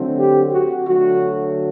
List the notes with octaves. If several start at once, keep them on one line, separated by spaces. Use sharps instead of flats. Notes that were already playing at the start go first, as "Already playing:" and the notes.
Already playing: D3 F#3 A3 C4
G4
F#4
D3 F#3 A3 F#4